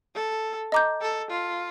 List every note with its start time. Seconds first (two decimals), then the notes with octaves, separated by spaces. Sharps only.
0.15 A4
0.72 D#5 A#5 D6 G6
1.01 A4
1.30 F4